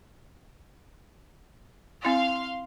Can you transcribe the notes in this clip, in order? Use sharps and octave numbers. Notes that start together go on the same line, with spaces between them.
C4 E4 F5 C6